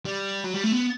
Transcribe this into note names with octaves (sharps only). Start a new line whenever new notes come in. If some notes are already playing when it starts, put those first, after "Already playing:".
G3
F#3
G3
A3
B3